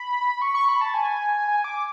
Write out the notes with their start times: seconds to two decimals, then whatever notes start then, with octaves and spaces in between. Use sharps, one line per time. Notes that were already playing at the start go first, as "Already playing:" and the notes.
Already playing: B5
0.42 C#6
0.54 C#6
0.68 B5
0.81 A5
0.94 G#5
1.48 G#5
1.64 D6